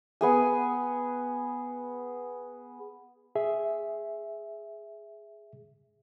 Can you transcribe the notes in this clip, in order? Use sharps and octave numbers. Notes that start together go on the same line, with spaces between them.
B3 G#4 G#5
G#4 E5